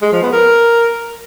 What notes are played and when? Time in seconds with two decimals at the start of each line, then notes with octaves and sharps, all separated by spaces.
0.02 G#3
0.13 F3
0.23 B3
0.33 A#4